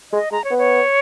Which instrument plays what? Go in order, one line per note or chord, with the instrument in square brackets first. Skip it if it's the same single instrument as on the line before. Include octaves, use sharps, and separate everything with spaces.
[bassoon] G#3 [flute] D#5
[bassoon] G#3 [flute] A#5
[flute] C#5
[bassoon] B3
[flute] C#5